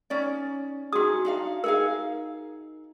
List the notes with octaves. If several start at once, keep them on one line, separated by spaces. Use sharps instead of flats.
C#4 D#4 D5
D#4 F#4 G#4 D#6
D4 D#4 F5
D#4 G#4 A#4 F5